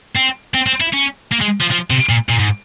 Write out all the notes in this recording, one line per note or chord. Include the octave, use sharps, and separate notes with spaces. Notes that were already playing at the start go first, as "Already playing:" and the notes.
C4
C4
C4
E4
C#4
A#3
G#3
F3
F3
C3
A#2
A#2
G#2